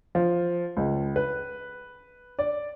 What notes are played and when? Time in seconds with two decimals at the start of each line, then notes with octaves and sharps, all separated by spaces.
0.15 F3
0.77 C#2
1.16 B4
2.39 D5